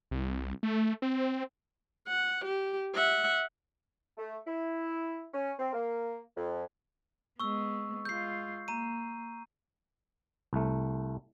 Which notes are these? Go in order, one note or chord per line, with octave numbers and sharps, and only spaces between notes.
C2
A3
C4
F#5
G4
E5 F#5
A3
E4
C#4
C4
A#3
F2
G#3 B3 C#6 E6
G#3 F4 G6 C7
A#3 A#5 D#7
C2 A3